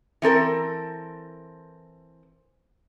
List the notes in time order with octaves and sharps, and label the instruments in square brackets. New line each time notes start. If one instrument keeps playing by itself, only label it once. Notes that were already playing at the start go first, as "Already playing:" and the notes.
[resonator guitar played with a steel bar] E3 C4 A4 A#4